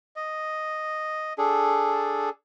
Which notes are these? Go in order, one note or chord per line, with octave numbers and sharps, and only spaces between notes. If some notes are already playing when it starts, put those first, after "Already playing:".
D#5
D4 G#4 A4